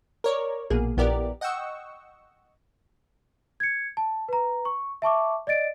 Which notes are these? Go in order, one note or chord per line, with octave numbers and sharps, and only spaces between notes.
A#4 C#5 D5
A#1 B2 A#3 G#4
A#1 B3 E4 G4 A#4 D5
D#5 F#5 G5 C#6 E6
G#6 C#7
A5
B4 A#5
C#6
E5 A5 C#6 D6
D5 D#5 A6 D7